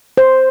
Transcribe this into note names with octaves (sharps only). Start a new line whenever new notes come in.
C5